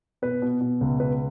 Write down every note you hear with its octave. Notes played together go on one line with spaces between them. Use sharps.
B2 B4
B2
B2
C#2
B2 B4